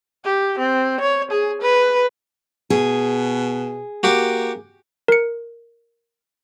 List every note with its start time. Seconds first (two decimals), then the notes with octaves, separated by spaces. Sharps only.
0.24 G4
0.59 C4
1.01 C#5
1.31 G#4
1.62 B4
2.70 B2 G#4
4.03 A#3 F#4 G4 D6
5.08 A#4 C#7